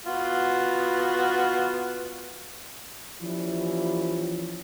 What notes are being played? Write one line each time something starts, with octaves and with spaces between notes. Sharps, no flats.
B3 F4 F#4
E3 F3 G3 A#3 C#4 E4